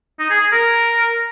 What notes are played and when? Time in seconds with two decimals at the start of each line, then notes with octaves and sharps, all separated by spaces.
0.19 D#4
0.30 G#4
0.41 G#4
0.52 A#4